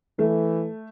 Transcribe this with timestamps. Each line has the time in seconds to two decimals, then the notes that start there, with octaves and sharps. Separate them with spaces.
0.18 E3 A3